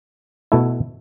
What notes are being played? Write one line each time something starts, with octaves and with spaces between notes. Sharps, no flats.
B2 A3 E4